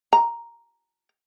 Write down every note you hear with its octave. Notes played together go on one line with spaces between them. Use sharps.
A#5